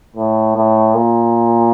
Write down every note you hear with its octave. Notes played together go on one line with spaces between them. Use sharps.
A2
A2
A#2